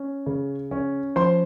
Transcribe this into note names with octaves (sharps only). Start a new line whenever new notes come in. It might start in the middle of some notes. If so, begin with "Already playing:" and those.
Already playing: C#4
C#3
C#4
F3 C5 C6